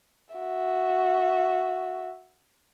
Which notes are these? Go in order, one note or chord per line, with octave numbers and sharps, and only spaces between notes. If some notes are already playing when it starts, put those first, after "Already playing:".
F#4 E5